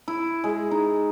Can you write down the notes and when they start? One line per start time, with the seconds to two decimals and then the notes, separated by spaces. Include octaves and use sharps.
0.08 E4
0.44 G#3
0.71 D#4